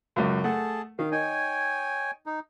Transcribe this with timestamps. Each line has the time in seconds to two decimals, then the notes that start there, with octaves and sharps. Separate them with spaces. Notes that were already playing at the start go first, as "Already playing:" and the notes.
0.16 C#2 F#2
0.44 A3 G#4 F#5 A5
0.99 D#3 F5
1.12 D#4 C#5 G5 G#5
2.26 D#4